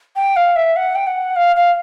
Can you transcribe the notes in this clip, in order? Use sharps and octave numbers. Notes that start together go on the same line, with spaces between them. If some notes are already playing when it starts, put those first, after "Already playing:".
G5
F5
E5
F#5
G5
F#5
F5
F5